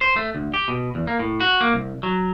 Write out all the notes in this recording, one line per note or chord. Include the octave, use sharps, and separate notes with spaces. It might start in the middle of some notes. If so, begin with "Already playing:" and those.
C5
A3
D2
G4
B2
E2
A#3
A2
F#4
A#3
C2
F#3